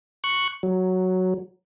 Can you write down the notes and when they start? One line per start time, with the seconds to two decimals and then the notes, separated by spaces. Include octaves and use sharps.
0.24 C#6 F#6
0.63 F#3